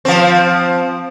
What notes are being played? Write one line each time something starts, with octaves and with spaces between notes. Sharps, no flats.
F3 C4